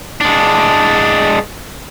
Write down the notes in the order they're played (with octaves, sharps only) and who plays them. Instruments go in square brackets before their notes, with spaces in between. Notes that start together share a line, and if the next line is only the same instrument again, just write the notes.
[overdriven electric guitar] G#3 D4